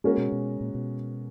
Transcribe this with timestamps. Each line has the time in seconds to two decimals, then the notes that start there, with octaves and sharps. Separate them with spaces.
0.04 G#3 A#3 C#4 F#4 A#4
0.18 B2
0.32 B2
0.61 A#2
0.75 B2